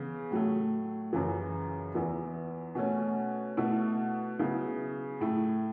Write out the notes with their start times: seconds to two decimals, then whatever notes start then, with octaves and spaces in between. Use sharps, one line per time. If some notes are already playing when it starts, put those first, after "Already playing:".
Already playing: C#3 E3 B3
0.31 A2 F#3 A3
1.13 F#2 C#3 E3
1.94 E2 E3 B3 E4
2.75 B2 A3 C#4
3.57 B2 A3 E4
4.39 C#3 F#3 B3 E4
5.20 A2 A3 E4